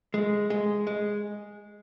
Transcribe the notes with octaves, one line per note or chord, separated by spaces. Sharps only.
G#3
G#3
G#3